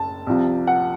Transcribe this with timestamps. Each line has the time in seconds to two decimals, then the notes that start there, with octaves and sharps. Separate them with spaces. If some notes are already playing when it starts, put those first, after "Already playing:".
Already playing: F#1 A5
0.27 C2 C3 F3
0.67 F#5